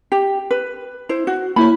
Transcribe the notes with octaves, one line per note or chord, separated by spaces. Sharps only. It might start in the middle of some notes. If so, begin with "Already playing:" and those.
G4
B4
E4 C5
F#4
A#3 E4 C#5 B5